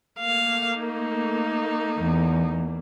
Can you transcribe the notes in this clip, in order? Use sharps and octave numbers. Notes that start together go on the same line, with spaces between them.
A3 A#3 F5
D#4
E2